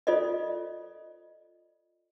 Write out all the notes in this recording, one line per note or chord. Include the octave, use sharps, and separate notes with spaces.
F4 A4 C5 D5 D#5